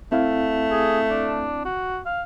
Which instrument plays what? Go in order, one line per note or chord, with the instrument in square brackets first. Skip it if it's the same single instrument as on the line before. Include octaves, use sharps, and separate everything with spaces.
[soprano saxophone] A3 [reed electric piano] C4 E4 F5
[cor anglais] G#4
D4
F#4
F5